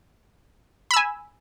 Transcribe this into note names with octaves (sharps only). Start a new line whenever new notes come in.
G#5 B5 E6